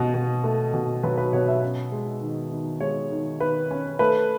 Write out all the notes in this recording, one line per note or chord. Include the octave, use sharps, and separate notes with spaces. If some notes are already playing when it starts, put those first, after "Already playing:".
Already playing: B2 C#4 D#5
B2
A3
B2
F#3 B4
B4
B2 C#5
E5
C#4
G#3
D#3
D#3
G#3 C#5
D#3
D#3 B4
C#4
A3 B4